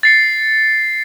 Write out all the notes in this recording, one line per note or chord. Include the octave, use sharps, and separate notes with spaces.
A6 C7 C#7